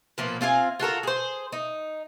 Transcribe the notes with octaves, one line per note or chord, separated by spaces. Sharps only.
A#2 F3 A#3 B3
C4 F4 F5 G#5
F4 F#4 A4 A#4
G#4 C5
D#4